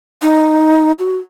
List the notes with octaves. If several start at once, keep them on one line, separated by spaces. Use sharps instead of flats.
D#4
F#4